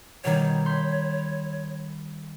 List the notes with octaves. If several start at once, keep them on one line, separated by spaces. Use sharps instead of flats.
B2 D#3 G3 C#5
B5 C6 G6